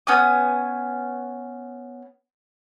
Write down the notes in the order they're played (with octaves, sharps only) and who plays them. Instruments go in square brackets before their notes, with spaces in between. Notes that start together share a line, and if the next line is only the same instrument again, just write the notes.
[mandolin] B3 C#4 G#5 D#6